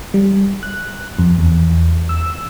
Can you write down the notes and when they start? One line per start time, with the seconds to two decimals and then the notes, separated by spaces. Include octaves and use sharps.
0.14 G3
0.63 F#6
1.19 F2
1.38 E2
2.09 E6